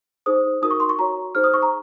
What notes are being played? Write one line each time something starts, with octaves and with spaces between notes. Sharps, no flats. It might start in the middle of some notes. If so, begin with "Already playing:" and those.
D#4 G#4 C5 D#6
D#4 F#4 A#4 D#6
C#6
C6
C#6
F#4 C#5 A#5
D#4 G#4 C5 F6
D#6
C#6
A#5